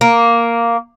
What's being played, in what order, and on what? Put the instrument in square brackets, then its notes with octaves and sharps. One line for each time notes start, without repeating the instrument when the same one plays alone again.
[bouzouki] A#3